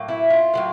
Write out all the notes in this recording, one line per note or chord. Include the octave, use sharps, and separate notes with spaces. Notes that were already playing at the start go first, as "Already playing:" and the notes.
Already playing: A2 F#3 A#3
E4
F4
A2 F#3 A#3